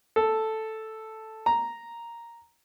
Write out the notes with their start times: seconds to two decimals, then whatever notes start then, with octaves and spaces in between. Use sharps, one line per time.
0.16 A4
1.46 A#5